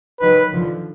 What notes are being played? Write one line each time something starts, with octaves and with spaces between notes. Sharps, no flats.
D#3 F#3 B4
D3 F3